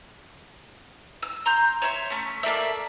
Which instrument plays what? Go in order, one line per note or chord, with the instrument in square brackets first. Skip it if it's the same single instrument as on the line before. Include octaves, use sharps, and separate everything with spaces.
[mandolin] E6
A#5 C6 G6
C#5 E5 C6
A3 C#4
A#3 A4 D5 E5